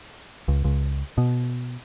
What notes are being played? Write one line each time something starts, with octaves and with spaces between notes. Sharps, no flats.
C#2
C#2
B2